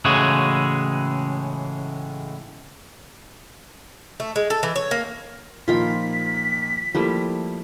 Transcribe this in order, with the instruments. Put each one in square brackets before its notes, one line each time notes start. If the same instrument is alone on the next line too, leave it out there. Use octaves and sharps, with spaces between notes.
[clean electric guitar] A2 C#3 E3 G#3 F#4 G#4
[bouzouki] A3
G#3
A4
E3
C#5
A#3
[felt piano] A#2 D#3 F3 [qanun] F4 A#4 B5 [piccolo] B6
[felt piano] F3 A#3 [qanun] G3 A3 E4